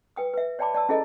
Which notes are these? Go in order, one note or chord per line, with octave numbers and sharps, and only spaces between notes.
B4 G5 D#6
B4 E5
C#5 D5 G5 A5 B5 D6
C#5 D5 A5 E6
C#4 E4 G#4 A4 D#5